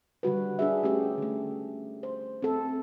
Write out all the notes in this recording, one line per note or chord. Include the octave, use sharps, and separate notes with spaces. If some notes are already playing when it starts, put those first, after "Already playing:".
D3 G3 F#4 B4
D4 G#4 E5
A3 C#4 D4 G4 G#4
D3 A3
C5
C4 A4